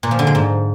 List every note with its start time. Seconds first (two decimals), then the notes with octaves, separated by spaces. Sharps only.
0.03 A#2
0.11 F3
0.19 D3
0.27 G#3
0.35 G#2